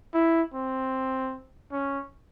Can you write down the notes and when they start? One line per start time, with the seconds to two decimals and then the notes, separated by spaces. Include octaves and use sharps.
0.14 E4
0.54 C4
1.72 C#4